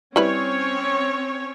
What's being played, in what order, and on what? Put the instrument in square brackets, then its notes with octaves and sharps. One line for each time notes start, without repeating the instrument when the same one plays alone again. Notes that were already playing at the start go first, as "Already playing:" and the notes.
[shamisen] G3 E4 B4 [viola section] C4 C#4 C#5